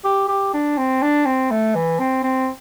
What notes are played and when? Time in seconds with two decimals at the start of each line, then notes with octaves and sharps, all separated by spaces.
0.05 G4
0.29 G4
0.54 D4
0.78 C4
1.02 D4
1.26 C4
1.51 A3
1.75 E3
2.00 C4
2.23 C4